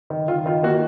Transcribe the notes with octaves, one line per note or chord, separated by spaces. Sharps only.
D#3
D#3 F4
D#3 F4
A#3 F#4